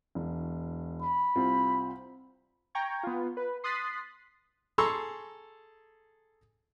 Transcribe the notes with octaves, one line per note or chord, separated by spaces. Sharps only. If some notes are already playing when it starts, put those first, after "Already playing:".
E1
B5
C2 C4 F4
G5 A#5 C#6 G#6
B3 F4
B4
C6 D#6 F#6 A6 B6 C7
G#4 A4 A#5 C6 C#6 E6